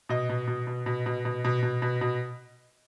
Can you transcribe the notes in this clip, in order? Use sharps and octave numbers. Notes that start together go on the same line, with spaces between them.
B2 D#5
B2
B2
B2
B2
B2
B2
B2
B2
B2
B2